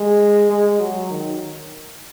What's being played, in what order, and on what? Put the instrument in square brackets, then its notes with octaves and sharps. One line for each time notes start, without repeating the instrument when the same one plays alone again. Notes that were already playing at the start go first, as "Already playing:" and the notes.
Already playing: [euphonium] G#3
G#3
F#3
D#3